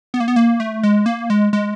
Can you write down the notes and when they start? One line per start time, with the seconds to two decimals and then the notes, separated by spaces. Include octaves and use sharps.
0.14 B3
0.20 A#3
0.28 B3
0.36 A#3
0.60 A3
0.83 G#3
1.06 A#3
1.30 G#3
1.53 G#3